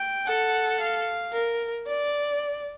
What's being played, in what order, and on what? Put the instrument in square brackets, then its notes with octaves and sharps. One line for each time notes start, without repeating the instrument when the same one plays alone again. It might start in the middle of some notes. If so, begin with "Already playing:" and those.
Already playing: [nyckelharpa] G5
[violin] A4 [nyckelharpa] F#5
[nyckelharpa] F5
[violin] A#4
D5